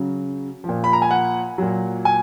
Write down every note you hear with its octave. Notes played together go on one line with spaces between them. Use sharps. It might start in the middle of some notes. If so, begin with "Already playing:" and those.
Already playing: C#3 F#3
A#2 F3
B5
A#5
G#5
F#5
A#2 F#3
G#5